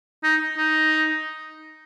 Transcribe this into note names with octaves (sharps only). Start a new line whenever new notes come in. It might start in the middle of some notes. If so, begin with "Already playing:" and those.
D#4
D#4